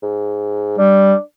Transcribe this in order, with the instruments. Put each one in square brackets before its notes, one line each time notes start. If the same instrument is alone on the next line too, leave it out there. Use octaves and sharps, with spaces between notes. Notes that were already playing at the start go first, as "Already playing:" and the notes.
[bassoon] G#2
[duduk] G3 [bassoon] D4